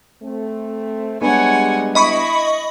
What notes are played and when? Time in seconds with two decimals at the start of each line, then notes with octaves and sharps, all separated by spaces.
0.23 A3 C4
1.22 G3 G#3 B3 D4 C#5 F#5 G#5
1.95 E4 D#5 B5 C#6